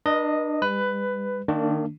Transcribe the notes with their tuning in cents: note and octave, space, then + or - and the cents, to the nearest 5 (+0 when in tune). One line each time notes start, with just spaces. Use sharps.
D4 +30 B4 -40 D#5 +0
G3 +35 B4 +15
D#3 -25 A#3 -40 D4 +0